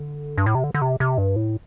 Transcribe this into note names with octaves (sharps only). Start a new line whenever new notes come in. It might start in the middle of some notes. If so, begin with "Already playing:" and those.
Already playing: D3
G2
A2
C3
D3
D3
C3
C3
G2
A2